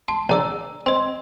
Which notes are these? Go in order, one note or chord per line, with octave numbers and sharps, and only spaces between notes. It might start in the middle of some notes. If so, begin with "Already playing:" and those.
A5 C6
A#1 D5 A#5 E6
C4 D#5 C6